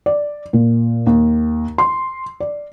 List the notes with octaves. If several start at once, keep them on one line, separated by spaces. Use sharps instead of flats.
D5
A#2
D#2
C6
D5